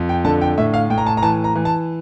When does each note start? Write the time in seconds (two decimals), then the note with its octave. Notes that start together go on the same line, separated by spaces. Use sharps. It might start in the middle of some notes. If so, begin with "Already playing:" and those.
Already playing: F2
0.09 G5
0.25 D3 A5
0.41 G5
0.58 A2 E5
0.74 F5
0.90 A2 G5
0.98 A#5
1.07 A5
1.17 A#5
1.23 E3 A5
1.44 A#5
1.55 E3
1.65 A5